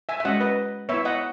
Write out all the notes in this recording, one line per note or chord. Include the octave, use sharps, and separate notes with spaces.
E5 G#5
E5
G#3 C#4 F#4 D#5 F#5
B4 D#5
B3 E4 C#5 E5
D#5 F#5